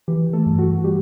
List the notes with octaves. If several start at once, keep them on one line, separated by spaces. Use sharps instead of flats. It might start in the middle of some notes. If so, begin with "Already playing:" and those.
E3 G4
A3 A4
G2
F#4
G3 G4